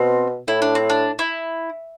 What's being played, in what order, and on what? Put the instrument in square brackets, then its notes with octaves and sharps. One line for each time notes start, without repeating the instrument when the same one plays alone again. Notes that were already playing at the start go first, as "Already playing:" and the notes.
Already playing: [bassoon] B2 [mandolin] C4
[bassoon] A2 [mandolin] E4
[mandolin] D4
C4
D4
E4